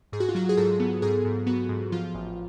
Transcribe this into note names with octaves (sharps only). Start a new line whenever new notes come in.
G#2 G#4
F#4
F4
F#3 F#4
G#4
G#2 A4
B3
G#2 G#4
G#2
B3 F#4
G#2
F3 F4
A1